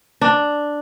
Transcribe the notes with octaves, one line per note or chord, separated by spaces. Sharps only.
D4